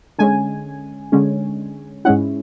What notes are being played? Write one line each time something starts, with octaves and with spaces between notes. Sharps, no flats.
D3 G#3 C#4 G#5
D3 G#3 C#4
G#2 G#3 C#4 E4 F#5